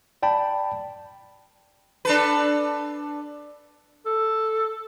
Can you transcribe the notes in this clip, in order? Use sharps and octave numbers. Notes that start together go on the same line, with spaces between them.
D5 G5 A5 B5
D4 A4 B4
A4